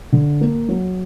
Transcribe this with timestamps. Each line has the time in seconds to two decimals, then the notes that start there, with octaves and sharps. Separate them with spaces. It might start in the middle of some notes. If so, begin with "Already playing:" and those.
0.12 D3
0.41 A#3
0.68 F#3